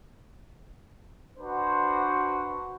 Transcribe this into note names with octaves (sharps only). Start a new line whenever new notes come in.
D4 F#4 B4 C5